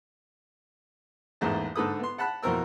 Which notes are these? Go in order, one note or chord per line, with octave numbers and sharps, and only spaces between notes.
A1 E2 G#2 A3 A#3 A5
G#2 D3 A4 B4 D#6
B3 C6
F#5 A5 B5 F#6
F2 B2 E3 C4 A#4 E6